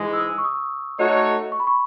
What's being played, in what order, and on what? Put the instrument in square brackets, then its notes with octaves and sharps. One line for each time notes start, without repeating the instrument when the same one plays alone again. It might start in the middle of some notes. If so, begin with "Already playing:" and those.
Already playing: [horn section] G#2 E3 G#3
[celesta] E6
D#6
C#6
D#6
[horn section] A3 D#4 F#4 C#5
[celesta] C#6
B5
C#6